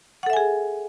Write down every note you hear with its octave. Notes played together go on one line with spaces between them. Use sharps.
G#4 A4 E5 F#5 G#5